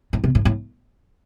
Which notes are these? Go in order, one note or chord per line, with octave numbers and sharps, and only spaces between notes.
A2
C3
A2
A2